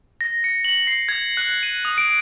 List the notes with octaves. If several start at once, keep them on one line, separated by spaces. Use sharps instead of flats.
A#6
C#7
F#7
C7
G#6
F#6
D#7
D#6
D7